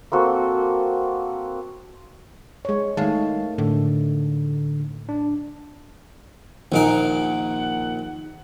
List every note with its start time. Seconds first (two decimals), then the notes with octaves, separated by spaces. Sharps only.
0.12 A#3 C4 F#4 A4
2.65 G#3 C#5
2.97 D#3 G#3 A3 F5 A5
3.58 A2 D3
5.09 D4
6.72 A#1 A#2 D#3 D#4 A#4 F#5